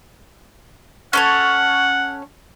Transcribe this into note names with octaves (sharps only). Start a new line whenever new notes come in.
C#4 A4 C#5 F#5